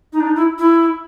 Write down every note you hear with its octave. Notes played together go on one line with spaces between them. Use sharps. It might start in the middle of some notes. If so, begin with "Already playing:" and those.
D#4
D4
D#4
E4
E4